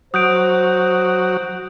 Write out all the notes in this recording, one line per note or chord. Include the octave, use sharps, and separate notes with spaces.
F#3 F#4 C5 D#6 G6 D7